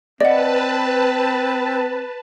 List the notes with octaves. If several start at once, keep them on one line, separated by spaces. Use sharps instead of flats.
C4 B4 D5 D#5 F#5 A5